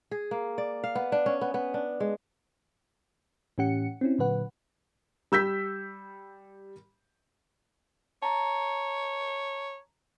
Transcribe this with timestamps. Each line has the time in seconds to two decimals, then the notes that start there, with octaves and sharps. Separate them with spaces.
0.11 G#4
0.31 A#3
0.58 D5
0.84 F5
0.95 B3
1.12 D4
1.26 C#4
1.41 B3
1.54 B3
1.74 D4
2.00 G#3
3.58 A2 E3 C#4 G4 F#5 C#7
4.01 C4 C#4 E4
4.19 A#2 D3 F#3 B4 F#5
5.32 G3 E6 G6 B6
8.22 C#5 A5 A#5